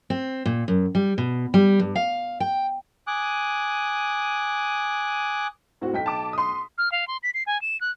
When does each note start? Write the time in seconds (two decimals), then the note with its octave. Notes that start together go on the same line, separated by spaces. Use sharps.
0.10 C4
0.46 A#2
0.68 F#2
0.95 G3
1.18 B2
1.54 G3
1.79 G2
1.96 F5
2.40 G5
3.07 G#5 D6 D#6 F#6
5.81 A2 C4 F#4
5.93 B1 G5 B6
6.06 A5 D6
6.33 C6 D#6
6.78 F6
6.92 F5
7.08 C6
7.23 B6
7.34 C7
7.46 G#5
7.61 E7
7.81 F#6